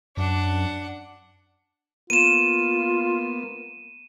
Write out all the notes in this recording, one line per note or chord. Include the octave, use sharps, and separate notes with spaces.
F#2 D4 F#5
A#3 B3 F4 D#7 E7